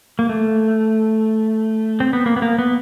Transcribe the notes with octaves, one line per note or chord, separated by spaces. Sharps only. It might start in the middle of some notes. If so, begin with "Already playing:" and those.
A#3
A3
C4
B3
A#3
B3
A#3
B3